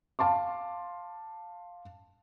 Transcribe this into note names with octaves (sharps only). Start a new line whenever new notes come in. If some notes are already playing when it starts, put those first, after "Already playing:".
F5 A5 C6 D6